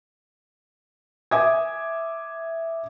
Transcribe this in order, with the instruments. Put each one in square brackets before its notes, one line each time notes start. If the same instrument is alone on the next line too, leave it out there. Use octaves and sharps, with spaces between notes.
[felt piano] E5 G#5 D6 D#6 G#6